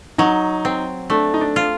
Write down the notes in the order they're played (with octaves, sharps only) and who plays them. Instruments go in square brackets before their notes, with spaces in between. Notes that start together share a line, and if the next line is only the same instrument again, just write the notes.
[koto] F#3 [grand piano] D#4
[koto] C4
[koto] A3 [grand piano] D4
[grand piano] D#4
D4
[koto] F4